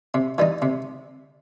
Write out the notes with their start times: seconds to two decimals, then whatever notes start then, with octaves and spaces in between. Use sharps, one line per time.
0.14 C3
0.38 E3 G3 D#4
0.62 C3